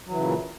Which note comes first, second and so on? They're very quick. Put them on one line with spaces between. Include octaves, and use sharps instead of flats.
F#3 E3 C#3 A#2